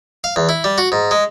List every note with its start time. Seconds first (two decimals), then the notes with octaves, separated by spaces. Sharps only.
0.24 F5
0.36 E2
0.49 E4
0.64 G3
0.78 F#4
0.92 G#2
1.11 G#3